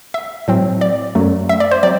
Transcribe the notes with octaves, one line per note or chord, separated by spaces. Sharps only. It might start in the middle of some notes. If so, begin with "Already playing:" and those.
E5
A2 F#3 C4
D5
F#2 F#3 A3
E5
D5
C5
F#3 C4 D5